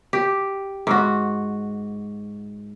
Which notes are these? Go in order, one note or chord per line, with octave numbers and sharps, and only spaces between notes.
G4
G#2 F#4